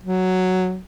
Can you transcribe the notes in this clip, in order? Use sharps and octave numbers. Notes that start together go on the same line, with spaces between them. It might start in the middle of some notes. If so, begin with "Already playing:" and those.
F#3